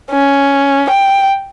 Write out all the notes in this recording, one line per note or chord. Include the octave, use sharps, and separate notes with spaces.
C#4
G5